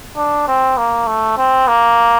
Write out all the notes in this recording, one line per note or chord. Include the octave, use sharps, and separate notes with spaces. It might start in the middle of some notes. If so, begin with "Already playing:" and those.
D4
C4
A#3
A3
C4
A#3